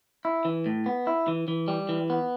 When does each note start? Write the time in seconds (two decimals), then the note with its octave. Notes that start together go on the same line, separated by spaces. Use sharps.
0.25 E4
0.45 E3
0.66 A2
0.86 B3
1.07 E4
1.28 E3
1.48 E3
1.68 G3
1.89 E3
2.10 B3